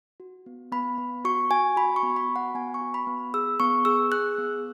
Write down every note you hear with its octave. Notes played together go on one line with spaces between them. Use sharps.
F#4
B3
B3 B5
B3
F#4 C#6
F#4 G#5
F#4 B5
C#6
B3
B5
F#4
F#5
B3 G#5
C#6
F#4
B5
B3
G#4 E6
B3 C#6
G#4 E6
G#4 F#6
B3